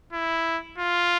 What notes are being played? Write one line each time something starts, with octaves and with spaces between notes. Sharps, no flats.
E4
F4